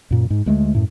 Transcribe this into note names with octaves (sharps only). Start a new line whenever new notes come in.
F#2 A#2
G#2
D2 G#3 A3
F#2 A2